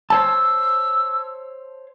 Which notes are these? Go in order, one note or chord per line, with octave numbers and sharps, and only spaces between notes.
C5 C#5 A5 E6